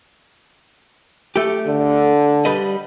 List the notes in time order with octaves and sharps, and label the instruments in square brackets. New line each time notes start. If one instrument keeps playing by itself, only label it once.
[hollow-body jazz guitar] A3 G4
[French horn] D3
[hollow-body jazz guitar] G3 B4 D#5